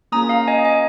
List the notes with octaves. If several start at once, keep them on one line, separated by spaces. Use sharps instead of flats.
A#3 C#4 F4 G#4 A#5 D#6
F5 A#5
D#5 G#5
D#5 G#5